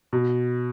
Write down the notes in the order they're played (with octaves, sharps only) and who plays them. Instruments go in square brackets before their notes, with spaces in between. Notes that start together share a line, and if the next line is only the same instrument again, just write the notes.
[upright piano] B2